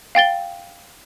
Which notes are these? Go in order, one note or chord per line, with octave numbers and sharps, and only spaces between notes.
F5 G5 A6 G7